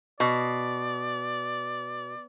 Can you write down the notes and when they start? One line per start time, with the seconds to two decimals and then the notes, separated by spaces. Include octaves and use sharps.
0.20 B2 D5